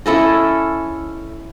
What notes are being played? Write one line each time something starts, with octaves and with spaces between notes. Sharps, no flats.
C#4 E4 A4 D#5